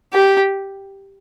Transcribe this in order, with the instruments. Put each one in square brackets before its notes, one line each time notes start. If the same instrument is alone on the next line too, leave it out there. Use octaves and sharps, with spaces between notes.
[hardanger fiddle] G4